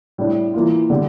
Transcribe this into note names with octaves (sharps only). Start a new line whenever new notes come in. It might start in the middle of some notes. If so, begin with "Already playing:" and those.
A2 G3 D4
E3 A#3 F4
D3 G3 D4 G4